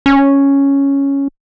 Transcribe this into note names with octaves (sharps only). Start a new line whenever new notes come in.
C#4